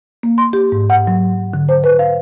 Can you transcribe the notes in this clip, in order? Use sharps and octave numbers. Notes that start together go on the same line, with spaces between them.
A#3
C6
G4
G#2
F#5
F#3
D3
C5
B4
F5